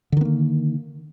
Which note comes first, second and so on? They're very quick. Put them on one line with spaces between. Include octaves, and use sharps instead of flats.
D3 D#3 B3 A#3